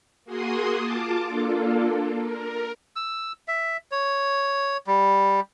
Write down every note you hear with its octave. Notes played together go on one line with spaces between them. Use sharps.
A#3 F#4 G#4 C6 D#6
F4 A5 D6
A#3 D4 F4 A4
A#4
E6
E5
C#5
G3